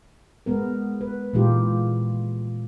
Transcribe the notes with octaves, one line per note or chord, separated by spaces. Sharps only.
G#3 B3 A#4
B4
A#2 E3 G#3 D#4 F4 G4